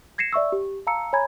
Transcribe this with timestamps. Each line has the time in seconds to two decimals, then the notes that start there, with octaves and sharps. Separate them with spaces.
0.18 G#6 A#6 C7 C#7 E7
0.33 D5 E5 C#6 E6
0.52 G4
0.87 F5 A5 A#5 E6 C#7
1.13 C#5 G#5 A#5 B5 G#6